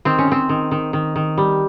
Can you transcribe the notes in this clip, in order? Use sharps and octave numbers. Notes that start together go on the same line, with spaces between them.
D#3 C4
C#4
D#3 C4
D#3
D#3
D#3
D#3
G3